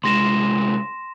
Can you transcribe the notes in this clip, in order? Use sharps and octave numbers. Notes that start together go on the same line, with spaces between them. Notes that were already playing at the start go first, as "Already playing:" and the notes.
C2 G#3 C6 A#6 E7